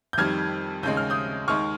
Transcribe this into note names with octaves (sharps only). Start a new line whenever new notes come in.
G6
F2 D#3 G3 F6 G#6
D#2 C#3 G#3 G6
F6
D#6 G6
D#2 D#3 G#3 C#6 F6